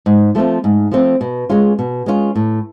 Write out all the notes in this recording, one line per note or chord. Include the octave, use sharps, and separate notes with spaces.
G#2
F3 A3 C4 F4
G#2
F3 A3 C4 F4
B2
G#3 C#4 F4
B2
G#3 C#4 F4
A2